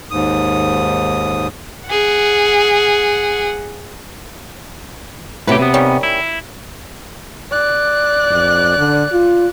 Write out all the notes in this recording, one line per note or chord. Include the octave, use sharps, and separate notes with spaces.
D#2 G#2 D#6
G#4 F#5
A2 C3 F#3 G4 B4
C3 B3
D#3 G3 C#4
E4
D5 F#6
F2
D3
F4